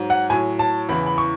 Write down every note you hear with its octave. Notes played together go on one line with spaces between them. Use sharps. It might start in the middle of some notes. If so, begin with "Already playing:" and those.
Already playing: G#2 F#3
F#5
A2 F#3 G#5
A5
E2 C#3 E3 B5
B5
C#6